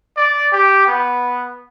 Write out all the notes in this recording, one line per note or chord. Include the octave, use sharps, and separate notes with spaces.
D5
G4
B3